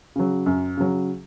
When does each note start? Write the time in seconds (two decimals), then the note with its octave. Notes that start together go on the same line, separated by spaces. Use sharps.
0.16 C#3 F#3
0.46 F#2
0.77 C#3 F#3